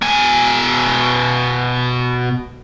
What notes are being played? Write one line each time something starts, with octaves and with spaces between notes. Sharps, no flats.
B2 G#5